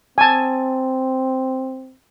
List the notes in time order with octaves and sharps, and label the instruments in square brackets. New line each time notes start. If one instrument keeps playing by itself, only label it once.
[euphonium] C4 [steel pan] G#5 A5